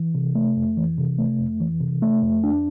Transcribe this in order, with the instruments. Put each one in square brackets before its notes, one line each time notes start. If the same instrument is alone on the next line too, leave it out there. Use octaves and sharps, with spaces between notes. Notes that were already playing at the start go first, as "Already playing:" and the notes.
Already playing: [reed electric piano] E3
C3
A3
F2
E3
C3
A3
F2
E3
C3
A3
F2
D4